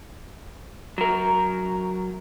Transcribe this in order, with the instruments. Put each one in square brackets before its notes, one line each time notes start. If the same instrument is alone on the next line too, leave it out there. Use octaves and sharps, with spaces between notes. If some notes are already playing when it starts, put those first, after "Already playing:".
[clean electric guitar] F#3 A#4